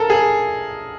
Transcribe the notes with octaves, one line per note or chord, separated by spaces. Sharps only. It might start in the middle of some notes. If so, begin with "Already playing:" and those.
Already playing: A4 A#4
G#4